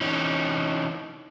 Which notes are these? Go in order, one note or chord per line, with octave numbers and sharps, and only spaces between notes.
E3 C#4 D#4